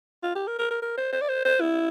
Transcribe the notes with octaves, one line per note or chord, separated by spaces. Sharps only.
F4
G4
A#4
A#4
A#4
A#4
C5
C5
D5
C5
C5
E4